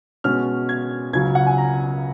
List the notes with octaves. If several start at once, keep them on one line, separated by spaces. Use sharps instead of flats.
B2 G#3 C#4 F6
G#6
C#2 C#3 F#3 G#6
F#5
G#5
A#5